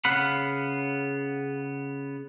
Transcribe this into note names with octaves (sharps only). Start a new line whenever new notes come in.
C#3 B3 F5 F#5 B5